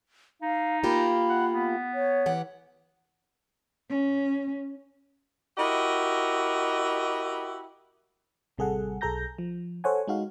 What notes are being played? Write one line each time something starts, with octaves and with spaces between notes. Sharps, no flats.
D#4 F5
A#3 F4 G4 B5
F#5
B3
C#5
E3 G4 F#5
C#4
E4 F#4 G4 A#4 D#5
A1 C3 G3 G#4 A4 F#5
B1 G#4 A4 A#5 G6 A#6
F3
A4 C5 C#5 F#5 G#5
G#3 D#4 F#4 F5